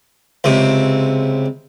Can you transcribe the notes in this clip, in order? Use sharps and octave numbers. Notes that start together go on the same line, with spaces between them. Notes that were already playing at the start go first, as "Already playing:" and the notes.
C#2 C3